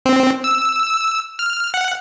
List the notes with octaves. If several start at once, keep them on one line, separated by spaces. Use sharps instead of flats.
C4
E6
F6
F#5